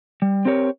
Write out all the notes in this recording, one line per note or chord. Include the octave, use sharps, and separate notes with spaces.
G3
C4 G4 A#4 C#5